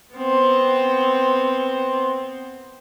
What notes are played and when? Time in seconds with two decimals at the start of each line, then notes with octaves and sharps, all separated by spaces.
0.14 B3 C4